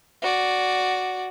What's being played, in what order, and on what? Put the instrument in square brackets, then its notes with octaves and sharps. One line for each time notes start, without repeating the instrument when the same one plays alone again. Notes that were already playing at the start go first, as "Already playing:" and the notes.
[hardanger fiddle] F#4 D5